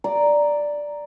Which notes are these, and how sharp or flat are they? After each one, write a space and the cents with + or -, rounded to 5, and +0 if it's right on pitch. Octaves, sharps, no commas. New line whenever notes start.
D5 +0 A#5 +0